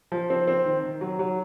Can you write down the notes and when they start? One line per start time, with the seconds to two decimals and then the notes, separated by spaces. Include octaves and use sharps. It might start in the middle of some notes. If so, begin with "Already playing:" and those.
0.12 F3
0.30 C4
0.48 C4
0.65 D#3
0.84 D#3
1.01 F#3
1.19 F#3